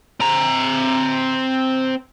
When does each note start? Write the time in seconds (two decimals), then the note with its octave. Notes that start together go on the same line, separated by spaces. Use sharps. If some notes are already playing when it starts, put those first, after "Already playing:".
0.20 C4 A#5